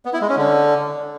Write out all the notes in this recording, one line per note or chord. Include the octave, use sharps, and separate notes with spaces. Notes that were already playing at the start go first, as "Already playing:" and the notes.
B3
E4
G#3
C#4
D3